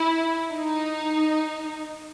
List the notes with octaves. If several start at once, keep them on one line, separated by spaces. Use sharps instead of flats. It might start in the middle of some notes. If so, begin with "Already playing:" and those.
Already playing: E4
D#4